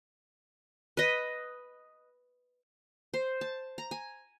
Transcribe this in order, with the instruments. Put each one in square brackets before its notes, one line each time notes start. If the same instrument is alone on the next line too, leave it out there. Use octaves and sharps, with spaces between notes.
[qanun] B4 D#5
C5
A5
A#5
G#5